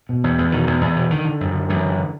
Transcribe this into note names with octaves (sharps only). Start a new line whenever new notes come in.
B2
E2
E2
B2 D#3
E2
E2
B2
D3 D#3
D3
F#2
D3
F#2 E3
D3
D3